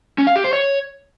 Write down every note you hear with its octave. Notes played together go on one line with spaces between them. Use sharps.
C#4
F5
G4
C5
C#5